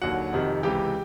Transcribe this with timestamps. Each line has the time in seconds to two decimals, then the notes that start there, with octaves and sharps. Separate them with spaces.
0.02 D#2 D3 F#3 F#4 F#5
0.33 F2 C3 D#3
0.63 C#2 C3 E3 G4 G5